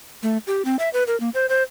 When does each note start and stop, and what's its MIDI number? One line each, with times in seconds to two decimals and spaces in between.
0.23 0.38 57
0.47 0.62 67
0.65 0.76 60
0.79 0.89 76
0.93 1.03 71
1.07 1.18 70
1.20 1.29 58
1.34 1.46 72
1.49 1.63 72